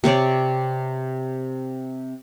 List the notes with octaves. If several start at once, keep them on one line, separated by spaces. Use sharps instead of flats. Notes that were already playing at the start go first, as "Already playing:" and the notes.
C3 C4 C#5 D5